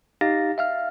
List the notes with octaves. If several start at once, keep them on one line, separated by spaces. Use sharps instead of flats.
D#4 G4 F5 A6 A#6
E5 F5 F6